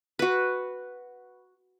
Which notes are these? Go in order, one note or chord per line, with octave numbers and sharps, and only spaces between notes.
F#4 B4